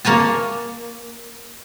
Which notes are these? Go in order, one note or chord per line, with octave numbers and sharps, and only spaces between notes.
A#3 C#5 G#5 A5